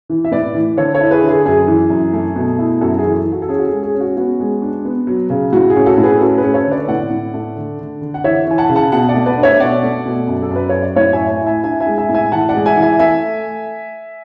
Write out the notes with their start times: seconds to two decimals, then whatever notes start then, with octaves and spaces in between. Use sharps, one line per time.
0.09 E3
0.24 E5
0.32 A2 B4 D5
0.54 E3
0.77 D3 A4 C#5
0.94 A4 C#5
1.00 E4
1.11 G#4 B4
1.22 D3
1.28 G#4
1.45 F#2 G#4
1.68 E3
1.90 F#2
2.13 A3
2.36 B2
2.58 E4
2.81 F#2 F#4 A4
2.98 G#4
3.04 E3
3.26 E3
3.32 F#4 A4
3.42 A4
3.49 C#4 G#4
3.59 F#4
3.66 G#4
3.72 G#3
3.83 G#4
3.95 C#4
4.00 F#4
4.17 B3 F#4
4.40 G#3
4.62 D4
4.85 B3
5.07 F#3
5.30 C#3
5.53 A2 F#4
5.70 G#4
5.76 C#4
5.86 F#4 A4
5.98 A2
6.03 G#4 B4
6.20 C#4 F#4 A4
6.38 G#4 B4
6.43 C#4
6.54 A4 C#5
6.66 D3
6.71 B4 D5
6.88 A2 D5 F#5
7.11 A2
7.34 A3
7.57 D3
7.79 D3
8.01 D3
8.14 F#5
8.24 E3 C#5 E5
8.47 E3 G#5
8.58 F#5 A5
8.69 C#3
8.75 F#5 A5
8.92 B2 F#5 A5
9.09 D5 F#5
9.15 A3
9.26 B4 D5
9.38 D4
9.43 C#5 E5
9.60 B2 D5 F#5
9.83 A3
10.05 B2
10.28 F#2
10.42 A4
10.51 F#2 B4
10.69 F#2 C#5
10.82 D5
10.96 A2 C#5 E5
11.13 E5 G#5
11.19 E4
11.30 E5 G#5
11.41 E4
11.47 E5 G#5
11.64 D4 E5 G#5
11.80 E5 G#5
11.86 G#3
11.98 E5 G#5
12.09 A2
12.14 E5 G#5
12.32 E3 F#5 A5
12.49 D5 F#5
12.54 G#3
12.66 E5 G#5
12.77 E3
12.82 E5 G#5
12.99 A3 E5 G#5